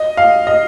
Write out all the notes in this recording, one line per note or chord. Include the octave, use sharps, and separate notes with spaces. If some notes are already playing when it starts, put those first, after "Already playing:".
Already playing: D#5
F5
D#5